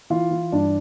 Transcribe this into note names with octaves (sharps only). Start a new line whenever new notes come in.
E3 F4 F5
E3
G2 D4 D5